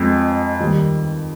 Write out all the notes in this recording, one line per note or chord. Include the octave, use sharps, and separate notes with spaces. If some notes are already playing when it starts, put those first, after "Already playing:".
Already playing: F2 G#3
D#2 D#3 G3